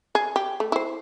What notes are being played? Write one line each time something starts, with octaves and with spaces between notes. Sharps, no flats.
G#4
G4
A3
E4 C5